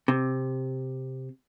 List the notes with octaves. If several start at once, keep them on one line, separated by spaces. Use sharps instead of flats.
C3